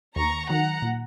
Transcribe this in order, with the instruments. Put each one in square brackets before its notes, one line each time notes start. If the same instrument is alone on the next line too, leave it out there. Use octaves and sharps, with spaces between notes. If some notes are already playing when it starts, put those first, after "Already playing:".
[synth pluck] D#2 [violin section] A#5 C#6
[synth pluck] D#3 F#3 [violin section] F#5 A#5
[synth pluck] A#2